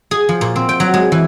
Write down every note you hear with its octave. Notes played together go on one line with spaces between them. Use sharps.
G#4
F3
A#2
C4
G5
F#3
G#3
E3